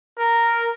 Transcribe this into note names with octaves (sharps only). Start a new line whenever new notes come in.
A#4